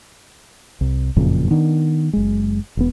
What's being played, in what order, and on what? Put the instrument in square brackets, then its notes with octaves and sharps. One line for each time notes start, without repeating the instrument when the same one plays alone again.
[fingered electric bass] C2
F#1 F2 A#2 C#3
D#3 B3 D4
F#1 G#3
E1 B3